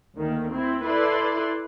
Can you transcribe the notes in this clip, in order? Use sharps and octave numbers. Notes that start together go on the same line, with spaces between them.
D2 D#3 A#3
C4 E4
E4 A4 B4 D5 C6